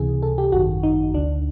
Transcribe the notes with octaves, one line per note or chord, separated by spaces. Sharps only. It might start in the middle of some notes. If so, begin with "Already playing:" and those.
Already playing: C#2 C3 E3 G#4
A4
G4
G#1 F#2 D#3 F#4
D#4
D2 D3 D4